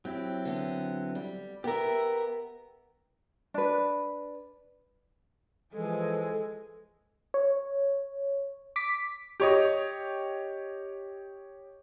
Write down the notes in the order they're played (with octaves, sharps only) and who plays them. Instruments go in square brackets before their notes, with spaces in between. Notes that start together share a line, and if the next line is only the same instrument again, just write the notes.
[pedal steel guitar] F#3 C4 E4 [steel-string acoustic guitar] G4
[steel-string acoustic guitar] D3 B3
G3
[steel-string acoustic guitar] B3 A#4 [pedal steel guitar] G4 E5
[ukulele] D4 B4
[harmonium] E3 F3 [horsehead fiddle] G#3 G#4 [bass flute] A4
[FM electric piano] C#5
D6 B6
[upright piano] G4 C#5 D#5